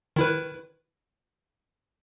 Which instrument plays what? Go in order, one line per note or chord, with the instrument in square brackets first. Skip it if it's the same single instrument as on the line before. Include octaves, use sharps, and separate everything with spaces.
[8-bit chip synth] D#3 E4 B4